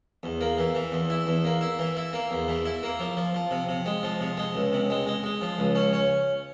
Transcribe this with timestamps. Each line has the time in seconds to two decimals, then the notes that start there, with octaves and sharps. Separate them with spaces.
0.23 E2
0.41 A#3
0.58 E3
0.75 E3
0.92 E2
1.10 E4
1.27 E2
1.45 A#3
1.61 E4
1.79 E3
1.97 E4
2.13 A#3
2.31 E2
2.48 E3
2.65 E4
2.83 A#3
3.00 F3
3.17 F3
3.34 F3
3.51 C3
3.69 C3
3.86 G#3
4.03 F3
4.21 C3
4.37 G#3
4.55 C#2
4.73 C3
4.90 G#3
5.07 G#3
5.24 G#3
5.41 F3
5.59 C#2
5.75 C#4
5.93 C#4